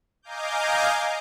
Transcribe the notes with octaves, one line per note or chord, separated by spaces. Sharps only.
D#5 F5 G#5 A#5 D6 G6